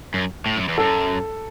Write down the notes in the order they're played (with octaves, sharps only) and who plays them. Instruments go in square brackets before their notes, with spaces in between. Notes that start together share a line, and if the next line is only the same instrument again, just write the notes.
[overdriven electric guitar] F#2
A2
F#2
E2
[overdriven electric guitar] F#2 [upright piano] A4